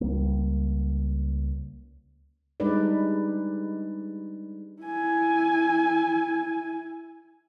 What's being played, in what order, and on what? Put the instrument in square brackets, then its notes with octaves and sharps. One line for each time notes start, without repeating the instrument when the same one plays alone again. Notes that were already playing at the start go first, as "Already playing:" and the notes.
[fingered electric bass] C#2 G3 A#3
[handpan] G3 G#3 D4 D#4 B4 D5
[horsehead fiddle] E4 G#5